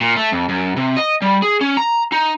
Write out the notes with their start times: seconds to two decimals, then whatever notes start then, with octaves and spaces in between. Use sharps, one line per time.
0.01 A#2
0.16 A3
0.32 F2
0.49 F#2
0.76 C3
0.97 D#5
1.22 G3
1.42 G#4
1.61 C#4
1.77 A#5
2.12 D#4